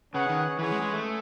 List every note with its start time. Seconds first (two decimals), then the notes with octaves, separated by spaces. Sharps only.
0.14 C#3 C#4 G#4 B4 F#5
0.29 D#3
0.59 E3 C#4 G#4 B4
0.71 G#3
0.82 G#3
0.94 A3